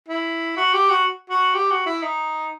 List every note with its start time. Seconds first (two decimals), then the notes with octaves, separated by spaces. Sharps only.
0.08 E4
0.57 F#4
0.73 G4
0.90 F#4
1.30 F#4
1.54 G4
1.71 F#4
1.86 E4
2.03 D#4